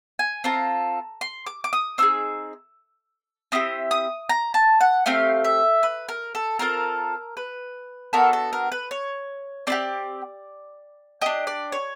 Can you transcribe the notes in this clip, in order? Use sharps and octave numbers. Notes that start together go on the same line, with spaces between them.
G#5
C4 F4 A4 A#5
C6
D6
D6
D#6
C4 D#4 G#4 E6
C4 E4 G4 D#6
D#6
A#5
A5
F#5
A3 C4 G4 F5
E5
B4
A#4
A4
C4 F4 A4 A#4
B4
B3 D4 F#4 A4 A#4
A4
A#4
B4
C#5
C4 E4 G4 D5
D4 G4 D#5
D5
C#5